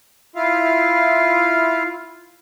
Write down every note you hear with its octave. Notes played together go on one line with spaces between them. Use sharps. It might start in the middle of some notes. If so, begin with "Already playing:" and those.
E4 F4 F5